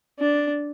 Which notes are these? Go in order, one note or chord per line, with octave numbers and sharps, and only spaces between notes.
D4